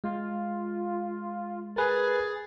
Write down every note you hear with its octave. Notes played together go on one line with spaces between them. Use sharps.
G#3 F4
G#4 A#4 B4 A6